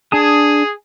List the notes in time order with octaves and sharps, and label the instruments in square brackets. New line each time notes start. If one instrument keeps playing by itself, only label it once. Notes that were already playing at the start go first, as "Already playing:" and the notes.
[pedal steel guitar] D4 A5 D#6 [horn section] G#4